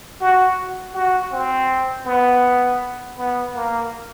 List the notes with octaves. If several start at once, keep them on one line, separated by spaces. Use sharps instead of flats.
F#4
F#4
C4
B3
B3
A#3